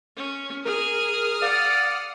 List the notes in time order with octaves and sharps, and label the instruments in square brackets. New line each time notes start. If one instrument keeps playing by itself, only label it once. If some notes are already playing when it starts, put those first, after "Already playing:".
[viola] C#4
[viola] G#4 [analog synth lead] A#4 [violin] D#6 F6
[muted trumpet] D5 [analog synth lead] F5 [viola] F#5